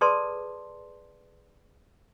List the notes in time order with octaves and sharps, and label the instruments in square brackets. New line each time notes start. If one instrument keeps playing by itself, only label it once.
[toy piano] G#4 A4 B4 D5 A5 C6